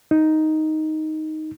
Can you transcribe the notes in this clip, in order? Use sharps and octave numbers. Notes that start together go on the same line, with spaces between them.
D#4